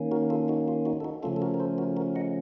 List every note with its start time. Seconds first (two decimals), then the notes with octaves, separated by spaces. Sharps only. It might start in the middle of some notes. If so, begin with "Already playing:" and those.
Already playing: D#3 A#3 C#4
0.11 F#4 A#4
0.30 F4 A4
0.48 D#4 F#4
0.68 F4
0.85 D#4 F#4
1.00 A4
1.04 D#4 F#4
1.23 C#3 F3 A3 C#4 F4 A4
1.36 A4
1.42 F#4 A#4
1.54 A#4
1.60 A4 C5
1.78 F#4 A#4
1.97 F#4 A#4
2.16 D#5 F#5